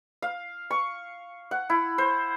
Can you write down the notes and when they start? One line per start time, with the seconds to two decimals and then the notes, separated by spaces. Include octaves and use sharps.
0.22 F5
0.71 C#6
1.51 F#5
1.70 E4
1.98 C5